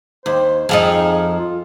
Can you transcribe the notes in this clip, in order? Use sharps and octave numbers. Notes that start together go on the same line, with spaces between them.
D#2 C5
F2 F3 D#4 G#4
F4